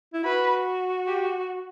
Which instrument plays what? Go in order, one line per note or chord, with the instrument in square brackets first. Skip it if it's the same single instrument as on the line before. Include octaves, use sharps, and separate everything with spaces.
[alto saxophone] E4
[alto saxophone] F#4 [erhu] B4
[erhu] G4